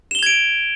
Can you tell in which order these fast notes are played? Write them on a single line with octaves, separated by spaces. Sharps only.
E7 G7 F7 G#6 D7